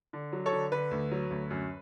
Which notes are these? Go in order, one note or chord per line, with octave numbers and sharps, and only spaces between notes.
D3
F#3
A4 C#5
D3
D3 B4
D2
F#3
D2
F#2